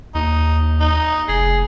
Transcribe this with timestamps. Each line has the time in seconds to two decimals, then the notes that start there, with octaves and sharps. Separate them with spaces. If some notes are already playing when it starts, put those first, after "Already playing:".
0.15 D#2 D#4
0.80 D#4
1.29 F1 G#4